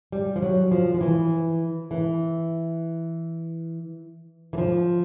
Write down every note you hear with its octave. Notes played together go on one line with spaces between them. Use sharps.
G3
F3
F#3
F3
F3
E3
E3
E3
F3